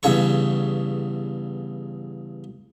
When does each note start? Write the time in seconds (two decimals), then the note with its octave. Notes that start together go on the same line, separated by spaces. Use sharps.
0.03 E2 G2 C#3 C#5 C#6